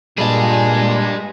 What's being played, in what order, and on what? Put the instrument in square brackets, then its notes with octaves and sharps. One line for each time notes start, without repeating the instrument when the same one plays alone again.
[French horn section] A#2 [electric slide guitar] G3 D4 [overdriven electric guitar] G#4 D#5